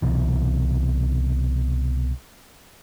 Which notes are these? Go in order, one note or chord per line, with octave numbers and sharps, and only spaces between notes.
C2 B2 E3